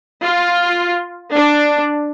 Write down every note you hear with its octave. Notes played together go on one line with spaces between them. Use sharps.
F4
D4